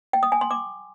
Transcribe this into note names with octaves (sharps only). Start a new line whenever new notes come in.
G5
D#6
G#5
C6
D6